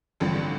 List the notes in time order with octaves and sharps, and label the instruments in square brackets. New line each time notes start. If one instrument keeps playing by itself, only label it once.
[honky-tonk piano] A1 G2 D3 F3 C4